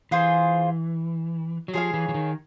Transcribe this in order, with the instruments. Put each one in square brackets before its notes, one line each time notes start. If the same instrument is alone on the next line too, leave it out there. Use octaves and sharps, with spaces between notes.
[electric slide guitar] E3 [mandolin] F4 G#4 C5
[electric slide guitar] F#3
[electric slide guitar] F3 [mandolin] G#4 C#5 F5
[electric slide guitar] E3
E3
D#3